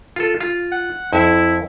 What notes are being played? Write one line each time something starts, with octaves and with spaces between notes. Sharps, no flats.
F4 A4
F4
F#5
F2 E4 E5